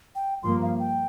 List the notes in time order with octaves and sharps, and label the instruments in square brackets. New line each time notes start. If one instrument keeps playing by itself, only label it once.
[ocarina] G5
[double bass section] G2 F3 A#3 [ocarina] C6
[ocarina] F5
G5